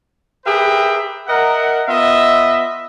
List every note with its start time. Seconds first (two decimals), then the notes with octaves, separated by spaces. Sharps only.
0.45 G4 G#4 A#4 B4 E5 G5
1.27 A#4 D#5 E5 F#5
1.88 B3 F4 D#5 E5